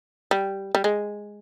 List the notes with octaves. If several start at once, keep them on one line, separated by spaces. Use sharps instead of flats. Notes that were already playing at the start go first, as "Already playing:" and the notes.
G3
G3
G#3